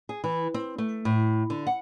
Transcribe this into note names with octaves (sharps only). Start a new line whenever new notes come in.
G#4
E3
C4
A3
A2
D3
F#5